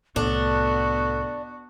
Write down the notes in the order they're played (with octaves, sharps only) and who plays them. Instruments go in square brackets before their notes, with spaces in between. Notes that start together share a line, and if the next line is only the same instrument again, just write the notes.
[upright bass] C2 A2 [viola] B3 F#4 [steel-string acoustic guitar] D4 [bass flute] A4